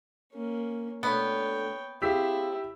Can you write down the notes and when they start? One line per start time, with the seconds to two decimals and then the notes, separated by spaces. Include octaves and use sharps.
0.33 A#3 C#4
1.03 B2 A3 B3 D4 C#5 G5
2.02 C4 E4 G4 G#4 F5 E6 B6